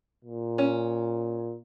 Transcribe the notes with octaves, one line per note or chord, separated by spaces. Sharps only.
A#2
C#4